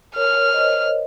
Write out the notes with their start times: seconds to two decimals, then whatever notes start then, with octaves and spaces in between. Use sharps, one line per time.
0.16 A#4 C#5 F6
0.53 C5 D#5